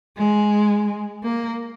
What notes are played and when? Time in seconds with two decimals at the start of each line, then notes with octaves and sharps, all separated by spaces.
0.17 G#3
1.23 A#3